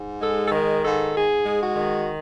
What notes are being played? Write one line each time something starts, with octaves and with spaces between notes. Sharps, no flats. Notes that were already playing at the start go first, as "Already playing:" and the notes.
Already playing: G#2
G#3 A4
A4
D#3 A#4
G#2 A4
G#2 G#4
G#3
F#4
D#3